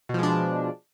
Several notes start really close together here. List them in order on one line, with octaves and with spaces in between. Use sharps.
B2 F3 G#3 D4